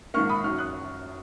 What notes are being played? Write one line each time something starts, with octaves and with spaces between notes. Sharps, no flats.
A#1 G#2 D#3 A#3 C#6 F6
B5 D#6
F#1 F#2 D#3 C#6 F6
D#6 F#6